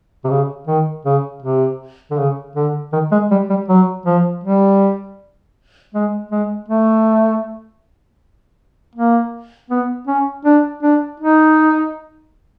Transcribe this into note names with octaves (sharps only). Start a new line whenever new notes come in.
C3
C#3
D#3
C#3
C3
D3
C#3
D3
D#3
G#3
G3
G3
F#3
F3
G3
G#3
G#3
A3
A#3
B3
C#4
D4
D4
D#4